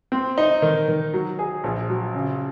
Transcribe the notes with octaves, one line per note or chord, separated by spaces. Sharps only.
C4
D#4
D#3
D#3
F#3
G#4
A#1
F#3
C#3